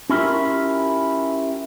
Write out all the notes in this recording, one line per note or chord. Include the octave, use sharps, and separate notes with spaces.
C#4 E4 F4 G4 A#4